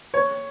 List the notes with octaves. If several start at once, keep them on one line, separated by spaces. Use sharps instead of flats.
C#5